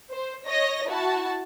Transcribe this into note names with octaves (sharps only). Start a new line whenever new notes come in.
C5
C#5 D#5 A#6
E4 F#4 A5